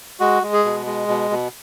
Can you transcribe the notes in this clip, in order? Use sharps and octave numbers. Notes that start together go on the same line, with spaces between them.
G#3 F#4
G#3
G#4
B2
G#3
B2
B2